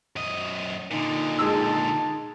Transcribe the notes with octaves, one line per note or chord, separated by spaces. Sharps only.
F#2 D#5
A#2 D3 D#4
G#3 A5 E6